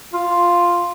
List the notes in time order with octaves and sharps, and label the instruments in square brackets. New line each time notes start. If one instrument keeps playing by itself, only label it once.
[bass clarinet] F4